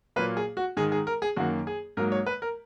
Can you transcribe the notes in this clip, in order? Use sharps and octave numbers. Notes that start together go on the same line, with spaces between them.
A#2 F#3 A#3 B4
G#4
F#4
G#2 D#3 G#3 G#4
G#4
A#4
G#4
F#2 D#3 A#3 F#4
G#4
G#2 F#3 A#3 A#4
C#5
B4
A#4